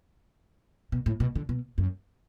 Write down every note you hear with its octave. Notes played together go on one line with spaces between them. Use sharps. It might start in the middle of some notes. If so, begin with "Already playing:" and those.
B2
A2
B2
D3
B2
F#2